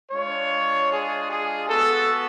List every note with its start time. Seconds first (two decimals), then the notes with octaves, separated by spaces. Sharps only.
0.10 G#3 D4 F4 C#5
0.90 G#4
1.29 G#4
1.69 B3 F#4 A4